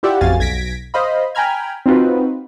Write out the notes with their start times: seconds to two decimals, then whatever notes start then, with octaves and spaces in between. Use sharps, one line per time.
0.03 E4 F4 G4 D5 E5 F#5
0.21 A1 F2 F#4 F5 G#5 A6
0.39 B1 G#6 A#6 B6 D7
0.94 C5 D#5 F5 B5
1.35 G5 G#5 A#5 B5 F6 G#6
1.86 C4 D#4 F4 F#4 B4